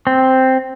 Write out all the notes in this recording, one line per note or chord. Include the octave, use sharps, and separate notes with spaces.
C4